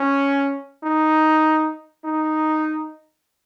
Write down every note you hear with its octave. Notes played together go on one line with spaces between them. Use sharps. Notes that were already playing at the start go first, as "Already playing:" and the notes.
Already playing: C#4
D#4
D#4